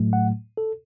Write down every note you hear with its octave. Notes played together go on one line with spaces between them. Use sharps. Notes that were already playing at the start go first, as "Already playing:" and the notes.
Already playing: A2 F#3 A3
F#5
A4